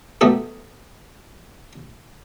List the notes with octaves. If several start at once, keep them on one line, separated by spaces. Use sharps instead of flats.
F#3 A3 B3 G4 G#4